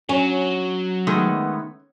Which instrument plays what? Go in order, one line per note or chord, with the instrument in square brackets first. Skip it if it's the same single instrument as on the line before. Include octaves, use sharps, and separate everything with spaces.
[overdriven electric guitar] F#3 [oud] C#4
[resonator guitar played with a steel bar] D#3 G#3 A3 [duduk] B3